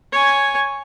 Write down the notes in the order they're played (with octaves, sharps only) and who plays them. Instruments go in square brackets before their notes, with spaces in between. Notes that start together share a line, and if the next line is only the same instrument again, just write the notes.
[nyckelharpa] C#5 G#5